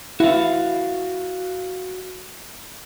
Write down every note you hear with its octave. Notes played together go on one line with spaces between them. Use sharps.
E4 F#4 F5